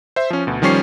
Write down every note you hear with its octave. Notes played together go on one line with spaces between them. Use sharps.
C5 E5
F3 C#4
D2 B2
D#3 F3 G3 C#4 C#6 C7